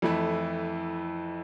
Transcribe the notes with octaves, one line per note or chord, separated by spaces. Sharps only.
F2 E3 A3 E4